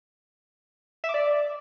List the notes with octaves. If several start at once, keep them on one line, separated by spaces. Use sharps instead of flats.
E5
D6
D5